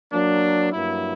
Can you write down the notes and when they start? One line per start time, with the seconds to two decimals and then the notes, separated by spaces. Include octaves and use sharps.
0.11 F#3 A#3 D4
0.72 G2 F#3 A#3 E4